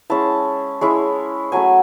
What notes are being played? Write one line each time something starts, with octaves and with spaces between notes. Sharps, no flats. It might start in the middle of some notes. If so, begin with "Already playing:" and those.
G#3 C#4 E4 A5
G#3 C#4 E4
F#3 A3 C#4 G#5